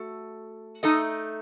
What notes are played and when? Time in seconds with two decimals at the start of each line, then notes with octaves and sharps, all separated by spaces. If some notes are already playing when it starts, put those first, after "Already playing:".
Already playing: A3 F#4 A4
0.83 A3 D#4 A4 D#5